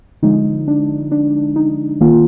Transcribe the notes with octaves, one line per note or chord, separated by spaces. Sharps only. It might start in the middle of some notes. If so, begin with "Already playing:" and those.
D3 F3 G#3 D#4
D4
D4
D#4
D#3 A#3 F4